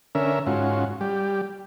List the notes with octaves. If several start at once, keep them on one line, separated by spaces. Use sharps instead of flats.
D3 C#4 A#4 E5
G#2 C#4 F4 F#4
G3 G4